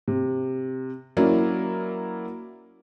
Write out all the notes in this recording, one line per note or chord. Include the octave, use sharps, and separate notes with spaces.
C3
F#3 A#3 C#4 E4 D5